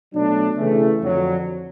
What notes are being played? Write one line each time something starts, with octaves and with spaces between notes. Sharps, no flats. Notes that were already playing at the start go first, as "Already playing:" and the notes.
B2 F#3 A3 D4
C#3 E3 A3
F2 D3 F#3